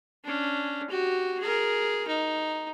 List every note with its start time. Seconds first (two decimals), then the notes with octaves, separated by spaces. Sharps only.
0.24 C#4 D4
0.90 F#4 G4
1.40 G#4 A#4
2.07 D#4